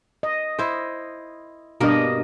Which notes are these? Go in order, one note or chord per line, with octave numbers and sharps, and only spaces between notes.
D#5
E4 C5
G2 B2 A#3 D4 A#4 D#5